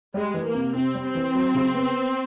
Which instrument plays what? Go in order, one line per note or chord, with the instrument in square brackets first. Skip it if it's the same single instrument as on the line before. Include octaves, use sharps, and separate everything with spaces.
[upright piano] G3 [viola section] G#3
[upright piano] E3
[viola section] A#3
[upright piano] C3
[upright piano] C3 [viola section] C4
[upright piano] G3
[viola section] C4
[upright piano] E3
F#3
C#3
B3